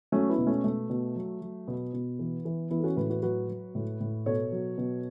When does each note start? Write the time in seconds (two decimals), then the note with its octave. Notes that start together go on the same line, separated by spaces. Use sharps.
0.12 F#3 A3 C#4
0.29 B3 E4
0.38 B2
0.47 A3 C#4
0.64 B2 A3
0.90 B2
1.16 F#3
1.42 F#3
1.67 B2 B3
1.93 B2
2.19 E3
2.45 E3
2.70 E3 B3 E4
2.79 A4
2.84 C#4 F#4
2.97 A2 F#4 B4
3.10 F#4 B4
3.22 F#3 F#4 B4
3.49 F#3
3.75 A2
4.00 A2
4.26 B2 A4 C#5
4.52 F#3
4.78 B2